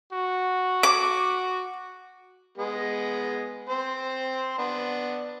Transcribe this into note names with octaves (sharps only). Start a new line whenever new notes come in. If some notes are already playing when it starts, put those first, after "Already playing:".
F#4
D6
G#3 B3 D#5
C4 C5
B3 D4